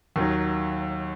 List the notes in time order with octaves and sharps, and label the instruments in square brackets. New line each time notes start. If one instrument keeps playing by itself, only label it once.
[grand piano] D#2 D#3 F#3